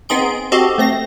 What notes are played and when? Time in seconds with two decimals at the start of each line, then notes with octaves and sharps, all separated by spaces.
0.09 B3 C4 D#4 G#4 C6 D7
0.52 C4 F#4 G4 A4 D#5
0.78 A3 C4 A#6